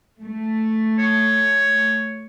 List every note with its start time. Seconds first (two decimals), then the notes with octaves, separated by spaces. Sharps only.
0.20 A3
0.99 C#5